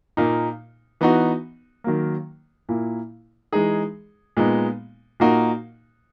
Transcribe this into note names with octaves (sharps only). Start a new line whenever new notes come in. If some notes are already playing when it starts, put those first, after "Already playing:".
A#2 A#3 D#4
E3 B3 D#4 F#4
D#3 F#3 A#3
A#2 A#3 E4
E3 G#3 D#4 G#4
A#2 G#3 B3 D#4
A#2 A#3 D#4 F#4